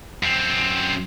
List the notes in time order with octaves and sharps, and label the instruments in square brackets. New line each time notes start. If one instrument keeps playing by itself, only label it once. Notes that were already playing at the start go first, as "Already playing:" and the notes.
[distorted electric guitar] F#2 C4